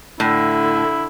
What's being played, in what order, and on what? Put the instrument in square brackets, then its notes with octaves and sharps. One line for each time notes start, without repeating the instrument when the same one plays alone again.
[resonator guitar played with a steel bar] A2 [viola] D3 [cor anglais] E4